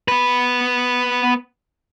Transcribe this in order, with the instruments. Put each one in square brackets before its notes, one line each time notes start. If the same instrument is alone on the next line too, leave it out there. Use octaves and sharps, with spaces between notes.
[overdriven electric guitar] B3 B4